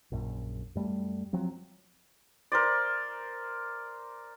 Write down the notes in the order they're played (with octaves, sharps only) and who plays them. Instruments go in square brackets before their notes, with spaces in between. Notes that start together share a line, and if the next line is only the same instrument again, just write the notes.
[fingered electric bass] A#1 F#2
F#2 G3 A3
F3 F#3 C4
[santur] A#4 C5 D5